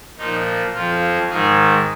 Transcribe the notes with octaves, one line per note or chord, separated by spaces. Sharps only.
A#2 F3 D#4
F2 F3 F4
G#2 D#3 G#4